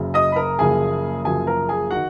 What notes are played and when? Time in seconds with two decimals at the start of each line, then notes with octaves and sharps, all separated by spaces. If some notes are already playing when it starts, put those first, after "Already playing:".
Already playing: F#1 F#2 C#3
0.14 D#5 D#6
0.32 B5
0.36 A#4 A#5
0.58 F#1 F#2 C#3 F3 A#3 G#4 G#5
1.24 F#1 F#2 C#3 F3 A#3 G#4 G#5
1.47 A#4 A#5
1.69 G#4 G#5
1.90 D#3 F#4 F#5